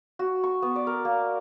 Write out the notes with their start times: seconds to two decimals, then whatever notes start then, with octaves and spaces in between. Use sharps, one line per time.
0.19 F#4
0.44 C#6
0.62 B3
0.76 D5
0.87 A#4
1.05 A#3